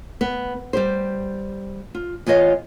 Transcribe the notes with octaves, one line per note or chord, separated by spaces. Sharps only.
B3
G3 G4 C5
F4
E2 F4 C#5 D#5 F5